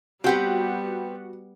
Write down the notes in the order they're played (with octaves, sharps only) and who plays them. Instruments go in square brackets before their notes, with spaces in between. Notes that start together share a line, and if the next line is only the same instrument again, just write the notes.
[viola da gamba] G3 B3 [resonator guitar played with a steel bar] C4 G4 B4 [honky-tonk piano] F#4 F#5